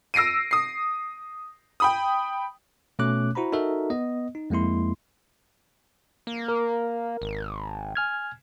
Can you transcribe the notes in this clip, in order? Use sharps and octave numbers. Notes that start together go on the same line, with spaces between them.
E6 A#6 C7 D7 D#7
D#6 C7
G5 B5 D#6
B2 A3 C#4 C#5 D6 F#6
E4 F#4 C5 A#5 B5
D#4 F#4 A4 A#4 E5
B3 D#5
D#4
F2 G#3 A#3 E4 C6
A#3
A#4
G#1
G#5 F6 G#6